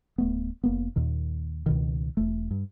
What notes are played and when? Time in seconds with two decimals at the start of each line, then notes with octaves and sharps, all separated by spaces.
0.18 D1 A3 B3
0.64 F1 A#3 B3
0.96 D#2 A#2 D#3
1.66 C#2 B2 D#3
2.17 E1 A3
2.51 G2